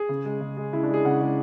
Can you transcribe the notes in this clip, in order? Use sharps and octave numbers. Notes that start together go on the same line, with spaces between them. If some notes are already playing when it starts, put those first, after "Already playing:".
Already playing: G#4
C#3
G#3
C#3
G#3
C#3 E4
D4
G#3 G#4
C#3 F#5
G#3 D5